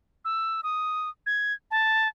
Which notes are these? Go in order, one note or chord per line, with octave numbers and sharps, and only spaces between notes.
E6
D#6
G#6
A5